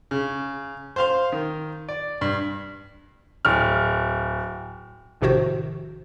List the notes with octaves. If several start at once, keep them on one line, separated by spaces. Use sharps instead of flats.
C#3
C5 F5 C6
D#3
D5
G2
D1 F6
A#1 A2 C3 D#3 F#4 C5